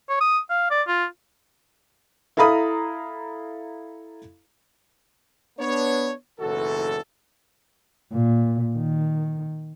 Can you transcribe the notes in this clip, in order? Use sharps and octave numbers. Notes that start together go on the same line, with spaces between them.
C#5
D#6
F5
D5
F4
E4 A4 F5 A#5 B5 D#6
B3 D4 C#5
F#1 B1 E3 F#4 A4
A#2
D#3